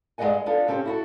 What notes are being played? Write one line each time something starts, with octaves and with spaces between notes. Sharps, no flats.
G2 G#3 F#4 D#5 F#5 G#5
B3 D4 F4 A4
C#3 C4 C#4 F4 G4
E4 F#4 A4